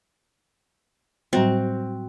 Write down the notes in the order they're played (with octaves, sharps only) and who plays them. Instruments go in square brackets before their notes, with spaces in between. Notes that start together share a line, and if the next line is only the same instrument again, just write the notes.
[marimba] A2 F#3 G3 [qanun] C4 F#4